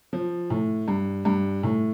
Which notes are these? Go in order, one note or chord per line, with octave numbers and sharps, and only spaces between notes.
F3
A2
G2
G2
A2